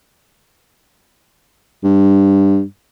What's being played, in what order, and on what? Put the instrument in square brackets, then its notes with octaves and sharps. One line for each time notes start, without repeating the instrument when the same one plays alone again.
[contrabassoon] G2